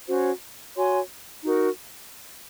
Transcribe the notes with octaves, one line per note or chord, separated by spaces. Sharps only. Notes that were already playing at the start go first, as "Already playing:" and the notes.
C#4 F#4 C5
F#4 C#5 G#5 C6
D#4 F#4 A#4